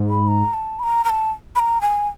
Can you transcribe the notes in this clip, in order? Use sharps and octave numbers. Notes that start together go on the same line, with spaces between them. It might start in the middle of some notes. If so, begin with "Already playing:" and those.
Already playing: G#2
B5
A#5
A5
B5
A#5
A#5
A5
B5
A#5
G#5